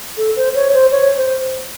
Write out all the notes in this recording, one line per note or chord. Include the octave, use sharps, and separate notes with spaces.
A4
C5
C#5
C5
C#5
C5